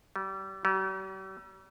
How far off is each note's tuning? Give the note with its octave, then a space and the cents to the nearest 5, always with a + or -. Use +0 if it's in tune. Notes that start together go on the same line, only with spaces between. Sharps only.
G3 -30
G3 -45